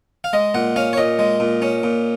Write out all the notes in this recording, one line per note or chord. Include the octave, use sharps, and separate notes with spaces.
F5
G#3 D#5
A#2 F#5
C#4 F5
C#5
A#2 D#5
G#3
A#2
C#4
A#2